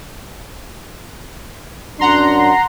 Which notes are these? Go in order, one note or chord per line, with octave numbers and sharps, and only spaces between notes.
F#2 D4 F#5 A#5 C6